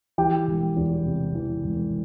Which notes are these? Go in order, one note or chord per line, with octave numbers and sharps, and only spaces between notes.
E3 G4 G5
E1
E2
C3
E3
E1